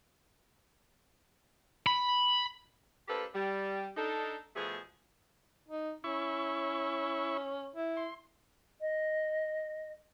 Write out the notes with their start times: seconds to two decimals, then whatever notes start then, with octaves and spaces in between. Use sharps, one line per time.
1.87 B5
3.08 A#3 D4 G4 A4 B4 C5
3.35 G3
3.97 D4 D#4 A4
4.56 B2 F3 A3 G#4
5.68 D#4
6.04 C#4 E4 C#6
7.75 E4
7.97 C6
8.81 D#5